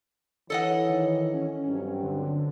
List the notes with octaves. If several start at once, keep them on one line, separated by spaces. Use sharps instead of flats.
E3 A4 C#5 D#5 F#5
D#3
C#4
G2 F#3 C4
D3